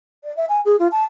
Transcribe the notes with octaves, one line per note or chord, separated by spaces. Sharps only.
D5
E5
G#5
G#4
F4
A5